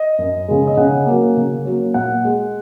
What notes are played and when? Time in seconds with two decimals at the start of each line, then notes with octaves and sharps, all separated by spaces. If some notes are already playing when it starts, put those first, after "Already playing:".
Already playing: D#5
0.18 F#2
0.48 C#3 G#3
0.67 D#5
0.77 C#3 F#5
1.06 F#3 A#3
1.37 C#3
1.65 F#3 A#3
1.94 A#2 F#5
2.25 G#3